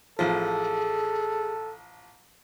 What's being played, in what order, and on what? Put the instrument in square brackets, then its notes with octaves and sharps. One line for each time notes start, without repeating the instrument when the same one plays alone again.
[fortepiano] A1 F3 [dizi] G#4 [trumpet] A4